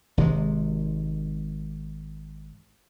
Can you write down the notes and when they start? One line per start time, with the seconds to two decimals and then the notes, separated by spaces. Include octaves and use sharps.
0.17 G#1 C3 G#3